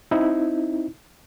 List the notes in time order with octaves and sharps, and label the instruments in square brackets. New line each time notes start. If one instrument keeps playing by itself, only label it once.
[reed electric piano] C4 D#4 E4